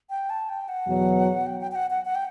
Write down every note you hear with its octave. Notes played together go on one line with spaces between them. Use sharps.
G5
A5
G5
F#5
E2 B2 F#3
G5
G5
G5
F#5
F#5
F#5
G5